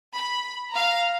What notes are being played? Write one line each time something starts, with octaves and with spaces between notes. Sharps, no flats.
B5
F5 A#5